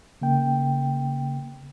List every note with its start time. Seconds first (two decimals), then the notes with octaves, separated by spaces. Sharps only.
0.21 C#3 A#3 G5